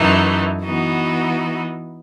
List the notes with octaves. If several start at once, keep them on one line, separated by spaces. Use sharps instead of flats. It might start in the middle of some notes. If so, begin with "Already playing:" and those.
Already playing: F#2 E3 A3 D#4
E3 B3 D#4 F#4